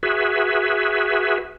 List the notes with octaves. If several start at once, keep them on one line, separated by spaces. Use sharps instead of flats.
F#4 G#4 B4 E5